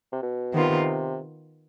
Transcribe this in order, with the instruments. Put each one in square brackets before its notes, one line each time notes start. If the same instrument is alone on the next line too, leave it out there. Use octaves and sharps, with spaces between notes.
[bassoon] C3
B2
[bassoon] C3 [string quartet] D#3 B3 F4
[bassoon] C3